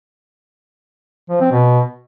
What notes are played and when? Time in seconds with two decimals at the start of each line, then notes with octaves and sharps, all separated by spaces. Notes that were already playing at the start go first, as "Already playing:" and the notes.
1.29 F3
1.41 C4
1.52 B2